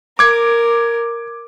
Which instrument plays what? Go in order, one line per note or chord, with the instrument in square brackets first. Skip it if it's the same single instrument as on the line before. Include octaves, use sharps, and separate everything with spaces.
[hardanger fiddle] A#4 [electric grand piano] D6 G#6